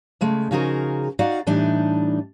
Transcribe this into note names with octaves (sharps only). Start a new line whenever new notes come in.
C#3 G#3 A3
C#3 F3 D#4 F#4 G#4 A#4
D#4 F#4 D5 F5 F#5
A2 E3 G3 D4 D#4